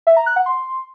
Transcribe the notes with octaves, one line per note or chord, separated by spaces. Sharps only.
E5
A#5
F#6
F#5
C6